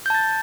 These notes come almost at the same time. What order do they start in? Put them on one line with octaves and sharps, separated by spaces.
G6 A5 A6